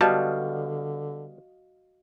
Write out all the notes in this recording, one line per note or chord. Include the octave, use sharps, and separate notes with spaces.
D3 G3 B3 F#4 D#5 F5 A5